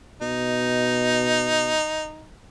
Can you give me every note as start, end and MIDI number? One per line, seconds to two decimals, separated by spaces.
0.22 1.75 47
0.22 2.27 63